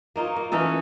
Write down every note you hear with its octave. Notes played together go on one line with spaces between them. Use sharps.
A#3 D#4 F4 C#5
A#3
E3 C#4 D#4 A4